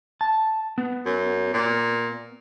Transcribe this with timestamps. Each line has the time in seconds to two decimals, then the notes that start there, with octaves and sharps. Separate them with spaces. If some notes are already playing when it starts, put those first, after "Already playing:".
0.21 A5
0.78 B3
1.06 F#2
1.54 A#2